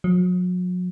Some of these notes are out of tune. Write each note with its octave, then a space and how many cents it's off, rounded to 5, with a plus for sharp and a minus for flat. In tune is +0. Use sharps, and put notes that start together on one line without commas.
F#3 -40